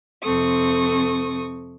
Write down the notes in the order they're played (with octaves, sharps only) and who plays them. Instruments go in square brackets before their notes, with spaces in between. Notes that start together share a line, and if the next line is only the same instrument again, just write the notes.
[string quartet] F2 C3 C4 A4 C#6 D#6